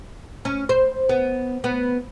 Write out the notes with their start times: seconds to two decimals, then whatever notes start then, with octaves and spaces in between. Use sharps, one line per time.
0.45 C#4
0.69 C5
1.09 B3
1.64 B3